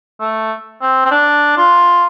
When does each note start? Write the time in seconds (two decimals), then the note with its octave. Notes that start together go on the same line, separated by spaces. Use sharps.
0.20 A3
0.81 C4
1.05 C4
1.11 D4
1.57 F4